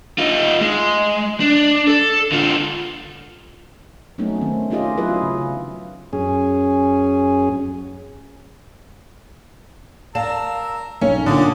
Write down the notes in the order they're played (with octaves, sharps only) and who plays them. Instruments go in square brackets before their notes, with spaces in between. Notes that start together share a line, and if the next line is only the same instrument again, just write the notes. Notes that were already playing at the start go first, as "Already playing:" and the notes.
[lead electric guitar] D#4 F4
G#3
D4
A4
D3 F4
[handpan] F#3 A3 B3 C#4 D#4
D#3 C4
C#4 D#4 F4 G4 G#4 D#5
F#3 E4 F4 G#4 B4
C#3
[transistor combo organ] F#2 C#4 G#4
[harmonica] A#4 A#5 E6 [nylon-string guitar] D5 F5 A5 [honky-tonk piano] E7
[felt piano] B1 [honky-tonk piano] C#4 [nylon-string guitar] C#5
[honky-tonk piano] A#2 D3 [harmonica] F5 D6 D#6